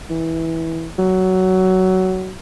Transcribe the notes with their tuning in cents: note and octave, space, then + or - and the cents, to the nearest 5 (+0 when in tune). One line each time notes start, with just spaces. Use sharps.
E3 -15
F#3 +15